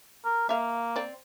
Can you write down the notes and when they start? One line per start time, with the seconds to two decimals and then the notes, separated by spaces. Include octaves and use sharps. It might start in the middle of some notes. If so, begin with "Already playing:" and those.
0.25 A#4
0.49 A#3 E5 F5
0.96 C4 D5